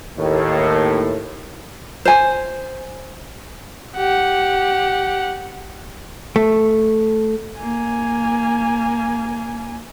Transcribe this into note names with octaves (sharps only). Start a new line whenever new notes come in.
D#2 A2
C5 G#5
G4 F#5
A3
A#3 G#5